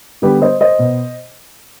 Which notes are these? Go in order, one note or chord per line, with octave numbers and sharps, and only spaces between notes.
D3 G3 B3 G4 B4
C5 D#5
C5 D#5
B2 B3